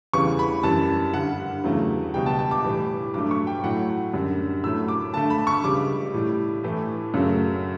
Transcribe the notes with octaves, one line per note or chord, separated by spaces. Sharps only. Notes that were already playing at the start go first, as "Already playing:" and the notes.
E2 C#3 E3 G3 C#6
B5
F#2 E3 G3 A5
G2 D3 G3 F#5
E2 C#3 F#3 A3
C#2 B2 G3 G5
A5
A5
D6
A2 E3 G3
G2 F#3 A3 D6
C#6
G5
A2 F#3 A3 F#5
F#2 D3 G3
A2 F#3 A3 E6
D6
G2 D3 A3 A5
B5
C#6
C#2 C#3 G3 D6
A2 G3
A2 E3 A3
F#2 C#3 F#3 A3